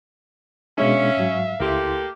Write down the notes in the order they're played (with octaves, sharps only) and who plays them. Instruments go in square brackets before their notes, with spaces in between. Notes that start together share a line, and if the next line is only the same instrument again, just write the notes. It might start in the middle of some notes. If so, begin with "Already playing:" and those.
[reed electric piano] B2 G#3 D4 [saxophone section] C#4 [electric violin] E5 F5
[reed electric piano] G#2 F#3
[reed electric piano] C#2 E4 C6 [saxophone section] A3 A#3 G4